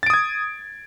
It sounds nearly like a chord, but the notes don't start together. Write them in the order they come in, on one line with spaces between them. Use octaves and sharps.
A6 D7 D#6 G#6